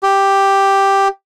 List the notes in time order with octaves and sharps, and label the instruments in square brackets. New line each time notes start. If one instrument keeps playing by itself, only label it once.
[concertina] G4